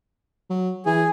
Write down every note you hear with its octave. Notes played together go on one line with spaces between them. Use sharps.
F#3
E3 G#4